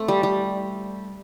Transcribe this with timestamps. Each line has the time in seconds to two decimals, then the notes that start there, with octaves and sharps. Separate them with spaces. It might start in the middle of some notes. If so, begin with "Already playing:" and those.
Already playing: A3 C4
0.08 G3
0.23 G3